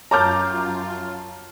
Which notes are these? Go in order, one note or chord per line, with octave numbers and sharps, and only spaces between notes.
F#2 F4 C#5 A5 A#5 D6 F6 G6